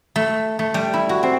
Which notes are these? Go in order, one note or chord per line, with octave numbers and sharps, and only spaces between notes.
A3
A3
G3
E4
F#4
C4